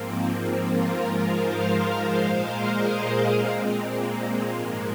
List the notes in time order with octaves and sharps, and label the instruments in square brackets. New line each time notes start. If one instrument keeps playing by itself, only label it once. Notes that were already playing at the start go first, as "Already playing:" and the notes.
Already playing: [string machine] G#2 F3 A#3 C4
C4
F4 A#4
G#2 F3 G#3
C5 F5
A#2 G#3 C5 F5
A#4 D#5
G#4 C5
A#2 G#3 C4
A#3
G#2 F3 G#3 A#3